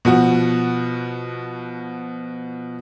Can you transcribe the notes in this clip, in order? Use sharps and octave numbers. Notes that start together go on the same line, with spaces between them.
B2 F3 F#4